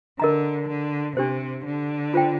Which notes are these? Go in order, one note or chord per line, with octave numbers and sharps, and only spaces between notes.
D3 A#4 D#5 A#5
D3
C3 D4 G4 C5
D3
F4 C5 G5